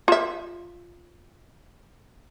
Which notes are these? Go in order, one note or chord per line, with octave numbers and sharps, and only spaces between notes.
F4 E5